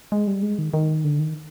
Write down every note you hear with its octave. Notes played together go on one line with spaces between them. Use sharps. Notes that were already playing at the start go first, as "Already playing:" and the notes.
G#3
G3
G#3
D#3
D#3
D3
D#3